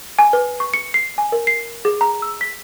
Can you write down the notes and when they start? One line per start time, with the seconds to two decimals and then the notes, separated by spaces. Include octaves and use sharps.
0.19 G#5
0.33 B4
0.60 C#6
0.74 C#7
0.94 C7
1.18 G#5
1.32 A#4
1.47 C7
1.85 G#4
2.01 A#5
2.22 E6
2.41 B6